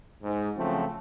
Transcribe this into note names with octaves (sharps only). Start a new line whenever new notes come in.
G#2
C#3 F3 F#3 A3 C4